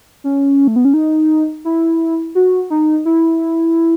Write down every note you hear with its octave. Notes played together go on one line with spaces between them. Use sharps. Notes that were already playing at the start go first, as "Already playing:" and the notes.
C#4
A3
B3
C#4
D#4
E4
F#4
D#4
E4